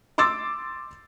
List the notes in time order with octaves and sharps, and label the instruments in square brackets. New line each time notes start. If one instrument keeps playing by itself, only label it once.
[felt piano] C6 D6 E6 A6